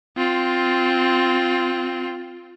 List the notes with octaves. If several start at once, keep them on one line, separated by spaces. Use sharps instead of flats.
C4 F4